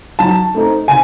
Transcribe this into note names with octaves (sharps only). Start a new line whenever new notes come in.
F#3 A5
A3 C4 D#4
C3 G#5